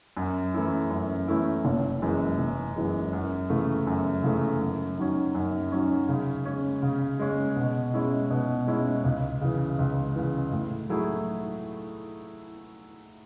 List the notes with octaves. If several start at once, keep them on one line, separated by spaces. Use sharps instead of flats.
F#2
E3 A3 C#4 E4
F#2
E3 A3 C#4 E4
F#1
F#2 E3 G#3
F#1
F#2 E3 G#3
F#2
C#3 E3 A3
F#2
C#3 E3 A3
F#2
D#3 F#3 C#4
F#2
D#3 F#3 C#4
C#3
G#3 C#4
C#3
G#3 C#4
B2
G#3 C#4 E4
B2
G#3 C#4 E4
C#2
C#3 E3
C#2
C#3 E3
A2
F#3 A3 E4 G#4